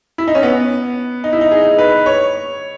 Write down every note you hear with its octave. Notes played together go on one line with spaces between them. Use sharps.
E4
D#4
C#4
B3
D#4
E4
D#4
G#4
B4
C#5